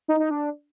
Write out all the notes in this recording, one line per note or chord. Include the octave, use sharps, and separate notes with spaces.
D#4
D#4
D4